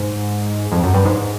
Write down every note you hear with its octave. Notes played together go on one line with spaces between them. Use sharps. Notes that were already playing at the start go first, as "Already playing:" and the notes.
Already playing: G#2
F2
F#2
G2
G#2